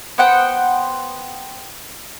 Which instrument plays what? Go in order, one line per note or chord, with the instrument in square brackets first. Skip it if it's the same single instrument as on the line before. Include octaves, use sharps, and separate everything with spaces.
[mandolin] B3 C5 F#5 G5